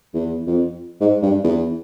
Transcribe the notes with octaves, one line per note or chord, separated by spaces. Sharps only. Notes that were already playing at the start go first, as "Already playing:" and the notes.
E2
F2
G#2
G2
E2